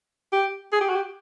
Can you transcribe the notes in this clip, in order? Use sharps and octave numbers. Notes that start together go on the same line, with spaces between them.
G4
G#4
G4
F#4
G4